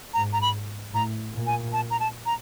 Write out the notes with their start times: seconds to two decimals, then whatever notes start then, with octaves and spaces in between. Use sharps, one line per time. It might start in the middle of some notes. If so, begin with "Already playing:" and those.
0.14 G#2 A#5
0.33 A#5
0.41 B5
0.93 A2 A#5
1.34 A#2
1.47 G#5
1.73 A5
1.90 A#5
2.00 A5
2.26 A#5